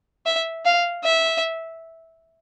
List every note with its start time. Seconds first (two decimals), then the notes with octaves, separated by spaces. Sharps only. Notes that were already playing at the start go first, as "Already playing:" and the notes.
0.26 E5
0.65 F5
1.04 E5